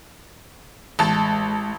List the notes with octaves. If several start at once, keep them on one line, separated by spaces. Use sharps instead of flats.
A1 G#3 A5